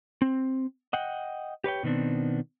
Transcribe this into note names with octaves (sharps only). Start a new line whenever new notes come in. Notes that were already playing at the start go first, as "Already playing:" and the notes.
C4
D#5 F#5 G5
G4 B4 C#5 G5
B2 D#3 B3 C4 D4